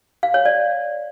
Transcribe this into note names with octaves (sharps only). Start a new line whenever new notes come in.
F5
C#5
D5